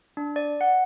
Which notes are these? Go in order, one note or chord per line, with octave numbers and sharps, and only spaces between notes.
D4
D5
F#5